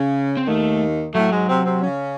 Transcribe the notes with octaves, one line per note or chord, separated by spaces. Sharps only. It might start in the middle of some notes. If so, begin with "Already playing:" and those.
Already playing: C#3 C#4
C4
D#2 D#3 A3
A2 F#3 A3
G#2 G#3
C3 C4
C3 C4
C#3 C#4